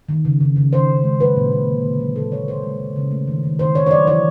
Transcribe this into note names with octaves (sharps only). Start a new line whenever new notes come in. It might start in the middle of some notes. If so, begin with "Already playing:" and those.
D#3
C#3
C#3
C#3
D#3 C5
D#3
G#3
F#3 B4
A#2
A#3
D3
D3
F#3
A#2 A4
F#3 C#5
A#2 C5
G#3
C#3
C#3
A3
D#3
D#3
D#3 C5
D#3 C#5
C#5
F#3 D5
E3 C#5